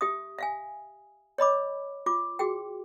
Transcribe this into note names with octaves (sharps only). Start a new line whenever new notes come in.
G4 E5 D#6
E5 F5 G#5
C#5 D#5 B5 D6
F4 D6
F#4 G#4 G5